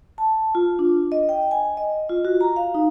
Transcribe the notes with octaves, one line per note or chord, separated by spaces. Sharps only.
A5
F4
D4
D#5
G5
G#5
D#5
F4
F#4
A#5
F5
D#4